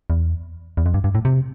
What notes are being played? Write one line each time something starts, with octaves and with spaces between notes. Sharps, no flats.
E2
E2
F2
G2
G2
A2
C3